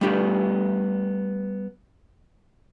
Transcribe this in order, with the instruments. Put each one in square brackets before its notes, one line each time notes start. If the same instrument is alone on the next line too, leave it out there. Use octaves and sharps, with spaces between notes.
[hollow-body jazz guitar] G3 A3 B3 D4 G4 D5